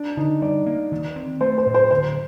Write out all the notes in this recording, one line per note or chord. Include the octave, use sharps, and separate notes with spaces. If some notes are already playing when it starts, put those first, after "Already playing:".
Already playing: D4
D3 D#4
G3 D5
A#3
D#3
C4
A3 C5
C5
A2
C5
D3 C5